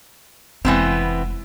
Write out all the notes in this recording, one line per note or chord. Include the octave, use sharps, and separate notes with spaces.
F1 E3 G#3 B3 C4